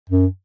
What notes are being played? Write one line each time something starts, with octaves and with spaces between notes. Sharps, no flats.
F#2